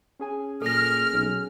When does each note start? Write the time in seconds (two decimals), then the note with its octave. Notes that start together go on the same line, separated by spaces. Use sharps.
0.19 C#4 G#4 G#5
0.62 A#2 A4 F6 A#6
1.13 B1